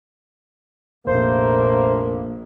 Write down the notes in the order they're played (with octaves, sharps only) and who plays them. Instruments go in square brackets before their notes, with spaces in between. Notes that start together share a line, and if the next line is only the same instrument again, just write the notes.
[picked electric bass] F1 [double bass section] A#1 [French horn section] A3 A#3 [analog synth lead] C5